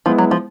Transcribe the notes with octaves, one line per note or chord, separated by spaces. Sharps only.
F3 G#3 B3 E4
F#3
F3